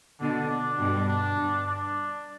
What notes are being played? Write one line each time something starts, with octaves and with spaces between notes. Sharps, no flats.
B2 D3 D4
D4
G2 B2
D4
G2
D4